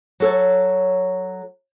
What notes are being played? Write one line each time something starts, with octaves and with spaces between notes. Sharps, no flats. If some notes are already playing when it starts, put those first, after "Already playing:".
F#3 A4 C#5